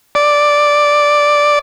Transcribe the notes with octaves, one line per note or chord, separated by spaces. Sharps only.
D5